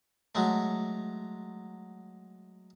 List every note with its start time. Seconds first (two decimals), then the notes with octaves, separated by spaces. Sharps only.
0.35 F#3 G#3 A3